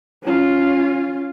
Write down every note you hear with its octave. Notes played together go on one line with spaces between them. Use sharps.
C#4 F4